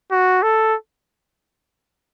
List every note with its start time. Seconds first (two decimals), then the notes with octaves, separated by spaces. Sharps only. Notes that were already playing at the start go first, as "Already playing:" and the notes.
0.11 F#4
0.43 A4